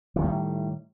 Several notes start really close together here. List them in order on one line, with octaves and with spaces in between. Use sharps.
E3 D#3 G3 A2